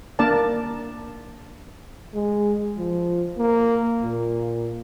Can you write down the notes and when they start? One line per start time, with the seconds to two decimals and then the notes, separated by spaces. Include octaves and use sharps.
0.19 A#3 D4 A#4 D5 A5
2.14 G#3
2.78 F3
3.37 A#3
4.03 A#2